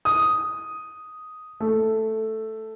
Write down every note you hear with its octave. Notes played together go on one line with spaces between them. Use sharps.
D#6
A3